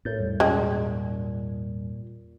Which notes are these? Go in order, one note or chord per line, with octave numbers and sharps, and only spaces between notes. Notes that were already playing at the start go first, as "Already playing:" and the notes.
A2 A#4 G6 A6
E2 G#2 G3
A#2 G#3 C#4 D#5 G5